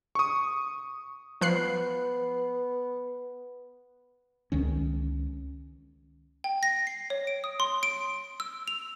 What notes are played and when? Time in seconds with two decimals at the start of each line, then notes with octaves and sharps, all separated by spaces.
0.15 C#6 D#6
1.41 F3 B3 F#6 C7
4.52 C#2 D#3 C#4
6.44 G5
6.63 A#6
6.87 C7
7.10 C#5
7.27 D7
7.44 D#6
7.60 C6
7.83 D7
8.40 E6
8.68 F7